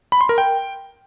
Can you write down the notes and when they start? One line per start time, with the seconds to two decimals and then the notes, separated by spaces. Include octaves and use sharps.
0.12 B5
0.21 C6
0.29 A#4
0.38 G5